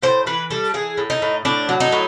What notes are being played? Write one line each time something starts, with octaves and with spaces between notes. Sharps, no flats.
A2 C5
E3 B4
G3 A4
E3 G#4
A2
D#4
A2
A2 D4
F#3
D#4
A2